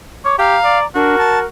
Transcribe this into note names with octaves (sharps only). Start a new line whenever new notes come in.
C#5 D6
G4 F5 A#5
D5
D4 F#4 A#4
A5